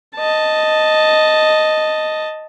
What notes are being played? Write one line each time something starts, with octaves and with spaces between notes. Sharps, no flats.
D#5 A5